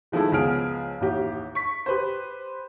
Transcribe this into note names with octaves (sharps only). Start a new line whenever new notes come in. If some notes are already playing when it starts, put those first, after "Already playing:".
D#3 F3 G#3 A3 E4
C#2 F3 B3 G#4 F6 D7
A1 D#2 F#4 G4
C#6 B6
G4 B4 C5